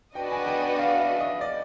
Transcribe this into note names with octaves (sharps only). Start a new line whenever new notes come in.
B3 D4 F#4 B4 D#5 G5
G#5
G5
F#5
F5
E5
D#5
D5